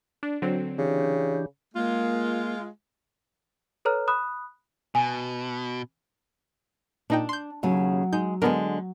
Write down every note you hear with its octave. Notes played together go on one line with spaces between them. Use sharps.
D4
D3 F#3 C4
C#3 E3 D4 G4
G#3 A#3 F4
A4 B4 C#5 A#5 F6
B5 D#6 F#6
B2 G#5
A#2 D4 D#4 G5
C6 G6
D#2 C#3 F#3
G#3 D#4 G6
D3 G#3 B3 D4 A#4